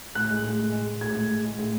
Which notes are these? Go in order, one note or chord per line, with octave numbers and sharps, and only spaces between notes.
A2 F#6
G#3
A2
G#3
G#3
G#3
A2 G#6
A2
G#3
G#3
A2